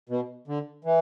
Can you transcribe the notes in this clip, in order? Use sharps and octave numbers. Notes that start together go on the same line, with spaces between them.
B2
D3
E3